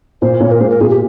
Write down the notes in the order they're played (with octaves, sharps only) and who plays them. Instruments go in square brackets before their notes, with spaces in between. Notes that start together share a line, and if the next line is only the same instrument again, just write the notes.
[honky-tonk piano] A#2 [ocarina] C5
[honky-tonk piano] A#2 [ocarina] C#5
[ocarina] A#4
[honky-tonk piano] G#3 [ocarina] C5
[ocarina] A#4
[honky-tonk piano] A#2 [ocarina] G#4
[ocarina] G4